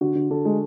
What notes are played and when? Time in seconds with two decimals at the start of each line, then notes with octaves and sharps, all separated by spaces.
0.01 D3 F#4
0.15 D3
0.30 D3 A4
0.45 G#3